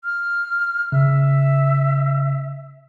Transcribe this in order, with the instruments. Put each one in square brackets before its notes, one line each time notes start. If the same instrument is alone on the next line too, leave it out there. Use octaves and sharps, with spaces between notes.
[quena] F6
[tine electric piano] C#3 [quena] E5